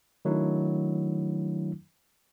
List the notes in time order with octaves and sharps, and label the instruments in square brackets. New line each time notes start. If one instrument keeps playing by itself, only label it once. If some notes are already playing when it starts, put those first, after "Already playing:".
[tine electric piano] D#3 F#3 A3 D4 E4